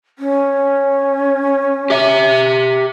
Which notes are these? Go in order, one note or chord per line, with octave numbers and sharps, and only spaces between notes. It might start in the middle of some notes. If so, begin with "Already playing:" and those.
C#4
G4 E5